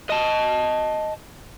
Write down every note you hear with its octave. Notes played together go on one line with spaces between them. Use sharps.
D#5 A5